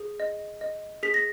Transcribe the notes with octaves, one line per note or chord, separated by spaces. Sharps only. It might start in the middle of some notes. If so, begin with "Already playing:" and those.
Already playing: G#4
D#5
D#5
G#4 B6
A#6